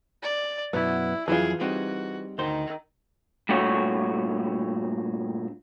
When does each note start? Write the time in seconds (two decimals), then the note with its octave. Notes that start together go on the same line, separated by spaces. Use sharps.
0.23 D5
0.73 F#2 B2 F#3 B3 E4
1.28 F2 E3 F#3 E4 F4 G#4
1.61 G3 C4 D#4 F#4
2.38 D2 D#3 D#4 C5
3.49 G2 A#2 A3 F#4 C#5